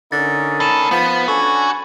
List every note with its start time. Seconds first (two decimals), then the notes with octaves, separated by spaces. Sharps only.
0.12 D3 C#4 D#4 A#4 A6
0.60 D2 A4 B5 D#7 E7
0.91 F3 B3
1.28 C#4 D4 F#4 A4 G#5